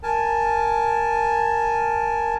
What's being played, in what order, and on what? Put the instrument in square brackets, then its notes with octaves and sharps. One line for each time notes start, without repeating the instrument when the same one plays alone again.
[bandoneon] A#4 G#5 A5